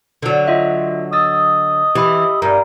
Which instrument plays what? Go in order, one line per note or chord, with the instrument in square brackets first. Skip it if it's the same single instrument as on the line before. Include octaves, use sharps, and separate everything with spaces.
[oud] D3 F#3
[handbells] F4 D#5 E5
[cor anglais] D#5 [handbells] D#6 E6 A6
[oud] E3 [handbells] G4 B5
[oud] G2 [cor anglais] A#4